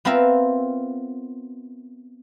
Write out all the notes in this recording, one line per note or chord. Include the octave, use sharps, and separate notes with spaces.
B3 C4 F4 A#4 E5